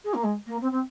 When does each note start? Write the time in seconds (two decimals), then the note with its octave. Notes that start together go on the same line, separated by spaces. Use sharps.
0.04 G#4
0.14 A#3
0.23 G#3
0.46 A#3
0.61 C4
0.71 C4